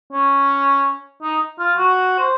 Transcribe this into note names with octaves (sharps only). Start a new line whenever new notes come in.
C#4
D#4
F4
F#4
C5